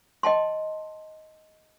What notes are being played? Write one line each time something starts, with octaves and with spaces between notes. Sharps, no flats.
D#5 G5 A5 C6